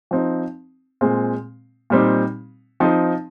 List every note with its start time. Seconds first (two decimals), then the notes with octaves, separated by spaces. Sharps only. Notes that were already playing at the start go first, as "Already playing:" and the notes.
0.11 F3 C4 D#4
1.01 A#2 G#3 C4
1.90 A#2 G3 C4 D#4
2.80 F3 C4 D#4